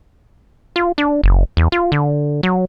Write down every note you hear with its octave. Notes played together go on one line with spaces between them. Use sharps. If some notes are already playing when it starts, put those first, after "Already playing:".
F4
D4
F#1
E2
F4
D3
F#3